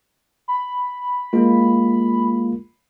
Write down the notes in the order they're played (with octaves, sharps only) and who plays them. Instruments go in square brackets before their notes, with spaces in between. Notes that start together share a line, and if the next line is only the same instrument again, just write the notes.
[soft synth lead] B5
[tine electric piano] G#3 A#3 F4